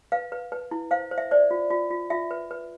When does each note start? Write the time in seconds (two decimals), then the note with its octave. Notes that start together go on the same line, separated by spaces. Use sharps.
0.12 B4 F5
0.32 B4
0.52 B4
0.71 E4
0.91 C5 F5
1.11 C5
1.18 E5
1.31 C5 D5
1.51 F4
1.71 F4
1.90 F4
2.10 F4 E5
2.31 B4
2.51 B4